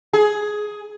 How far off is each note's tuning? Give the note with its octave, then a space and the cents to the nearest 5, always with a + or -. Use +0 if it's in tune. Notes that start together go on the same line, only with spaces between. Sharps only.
G#4 +10